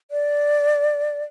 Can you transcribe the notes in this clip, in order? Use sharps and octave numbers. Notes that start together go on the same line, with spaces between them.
D5